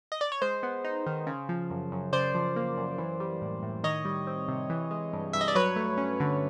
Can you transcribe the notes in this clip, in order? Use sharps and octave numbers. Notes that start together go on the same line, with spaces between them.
D#5
D5
C#5
G#3 C5
B3
D#4
D#3
C#3
F3
F#2
F#2
C#3 C5 D5
F3
A#3
F#2
E3
G3
A2
A2
D#3 C#5 D#5
G3
C4
C3
E3
G#3
G2
G2 E5
D#5
D5
F#3 B4 C#5
A3
C#4
D3